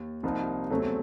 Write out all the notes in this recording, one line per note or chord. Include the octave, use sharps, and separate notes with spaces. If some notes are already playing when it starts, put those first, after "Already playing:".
Already playing: D#2
C2 C3 F3 A#3 D#4
E2 C#3 F#3 A3 C4